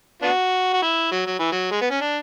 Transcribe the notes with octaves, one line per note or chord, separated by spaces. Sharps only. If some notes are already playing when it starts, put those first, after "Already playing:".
B3 D4 F#4
F#4
E4
F#3
F#3
E3
F#3
G#3
B3
C#4
D4